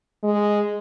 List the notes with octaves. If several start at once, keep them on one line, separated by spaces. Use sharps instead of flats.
G#3